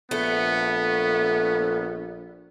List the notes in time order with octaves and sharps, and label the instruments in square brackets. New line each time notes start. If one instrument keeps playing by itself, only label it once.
[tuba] A#1 [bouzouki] A3 [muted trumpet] B3